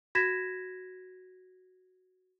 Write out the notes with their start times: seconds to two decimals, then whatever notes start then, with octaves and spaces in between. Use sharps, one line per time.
0.15 F#4 G#6 A#6 B6 E7